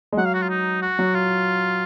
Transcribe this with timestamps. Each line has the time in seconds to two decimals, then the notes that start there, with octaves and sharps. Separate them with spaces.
0.12 G#3
0.17 F#3 F#5
0.26 F5
0.34 F#4
0.42 F4
0.50 D#4
0.82 F#4
0.99 F#3
1.15 F4